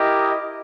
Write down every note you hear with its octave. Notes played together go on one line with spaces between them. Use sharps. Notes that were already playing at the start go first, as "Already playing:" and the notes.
Already playing: E4 G4 A#4 D#5